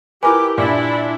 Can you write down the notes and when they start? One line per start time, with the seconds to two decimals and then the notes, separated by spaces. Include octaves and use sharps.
0.23 E4 G4 A#4 B4 G#5 D6
0.58 A#2 D4 E4 D5